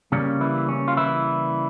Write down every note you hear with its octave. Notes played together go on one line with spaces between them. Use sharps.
C#3 G3 A#3 C#4
E3 E4
C#4
F4
E3 E4